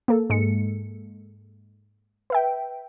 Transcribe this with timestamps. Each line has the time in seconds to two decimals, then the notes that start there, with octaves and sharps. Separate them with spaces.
0.08 A#3 A4
0.30 G#2 G#3 C#7
2.30 B4 E5 G5